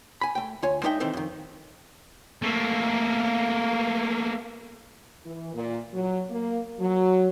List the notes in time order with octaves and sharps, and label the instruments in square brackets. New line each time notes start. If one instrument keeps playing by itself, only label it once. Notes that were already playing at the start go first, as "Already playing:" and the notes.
[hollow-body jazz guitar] G#5 B5
A3 G5
D2 F4 C#5 G#5
G#3 D4 D#4 E5 G5
D#3 E3 A3 C4 D#4
F2 D#3
[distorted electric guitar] A3 A#3
[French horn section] E3
A#2
F#3
A#3
F#3